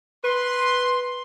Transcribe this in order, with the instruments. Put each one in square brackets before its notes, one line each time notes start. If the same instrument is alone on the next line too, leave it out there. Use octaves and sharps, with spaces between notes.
[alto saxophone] B4 [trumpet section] C6